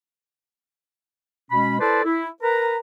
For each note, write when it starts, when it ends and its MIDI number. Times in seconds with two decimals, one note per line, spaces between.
1.51 1.79 47
1.51 1.79 56
1.51 1.79 61
1.51 1.79 83
1.80 2.04 64
1.80 2.04 69
1.80 2.04 71
1.80 2.04 72
1.80 2.04 74
1.80 2.04 81
2.05 2.28 64
2.43 2.77 70
2.43 2.77 71
2.43 2.77 82